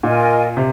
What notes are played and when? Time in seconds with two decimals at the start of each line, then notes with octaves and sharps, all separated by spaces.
0.03 A#2 F4 A#4 D#5 G#5
0.57 C3